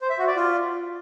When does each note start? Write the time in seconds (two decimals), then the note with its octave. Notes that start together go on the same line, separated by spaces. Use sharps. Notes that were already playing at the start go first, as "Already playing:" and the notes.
0.01 C5
0.10 E5
0.18 F#4
0.27 D5
0.36 F4